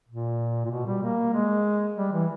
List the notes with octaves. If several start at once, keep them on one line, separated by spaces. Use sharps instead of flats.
A#2
A#2
B2
G3
A#3
G#3
G3
E3